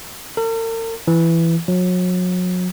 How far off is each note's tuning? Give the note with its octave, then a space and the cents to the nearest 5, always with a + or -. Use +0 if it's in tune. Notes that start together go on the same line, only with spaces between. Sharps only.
A#4 -45
E3 +10
F#3 -35